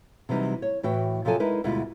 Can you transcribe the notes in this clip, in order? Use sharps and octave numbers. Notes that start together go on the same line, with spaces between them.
C3 E3 F#3 G3 D#4
C#5
A2 E3 F#4 G5
C3 F3 F#3 A4 G#5 A5
G#3 D#4 E4 A#4 B4
D2 B2 G3 G#3 E4 F4